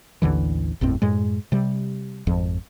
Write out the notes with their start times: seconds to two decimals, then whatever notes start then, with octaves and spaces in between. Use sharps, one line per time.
0.22 A1 D#2 D3 E3
0.81 G1 E2 A2 C4
1.02 F#2 A2 G#3
1.52 C3 G3
2.27 G#1 F2 F3